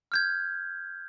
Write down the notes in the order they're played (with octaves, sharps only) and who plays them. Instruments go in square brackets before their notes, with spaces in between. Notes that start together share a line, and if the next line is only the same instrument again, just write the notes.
[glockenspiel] F6 G6 G#6